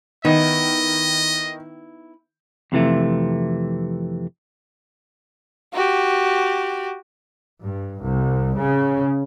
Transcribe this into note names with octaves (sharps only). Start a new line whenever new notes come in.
D#3 B3 D#4 E4 D#5
F2 C3 E3 A3
F#4 G4
G2
C2
C#3